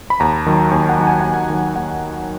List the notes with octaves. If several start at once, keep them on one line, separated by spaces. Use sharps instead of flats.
B5
D#2 A#5
D#3 F#3
D#2 G#5
F#5
D#3 F#3
G#5
D#2 F#5
G#5
D#3 F#3
D#2 F#5